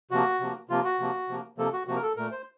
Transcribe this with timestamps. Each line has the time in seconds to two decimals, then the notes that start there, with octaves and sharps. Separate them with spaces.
0.11 C3 F3 A#3 F#4
0.40 C3 F3 A#3
0.69 C3 F3 A#3 F4
0.84 F#4
0.99 C3 F3 A#3
1.28 C3 F3 A#3
1.58 C3 F3 A#3 A4
1.73 F#4
1.87 C3 F3 A#3 F#4
1.96 A#4
2.02 A4
2.16 A#2 A3 A#4
2.32 C5